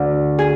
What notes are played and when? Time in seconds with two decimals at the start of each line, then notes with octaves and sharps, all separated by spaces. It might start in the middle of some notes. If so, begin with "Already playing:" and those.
Already playing: D2 D3
0.39 G#4